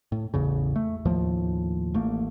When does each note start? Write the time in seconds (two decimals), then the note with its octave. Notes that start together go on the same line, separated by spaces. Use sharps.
0.12 A2
0.34 A1 E2 C#3
0.76 A3
1.05 D#2 A2 F3
1.94 A1 A3 A#3